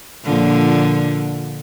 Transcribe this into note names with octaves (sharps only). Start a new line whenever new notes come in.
A#2 D3 F3